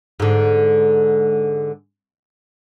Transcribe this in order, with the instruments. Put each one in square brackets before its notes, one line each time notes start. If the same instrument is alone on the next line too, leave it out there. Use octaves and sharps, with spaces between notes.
[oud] G#2 D3